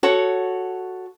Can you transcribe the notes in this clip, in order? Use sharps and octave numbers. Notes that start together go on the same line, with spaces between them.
F#4 A4 C#5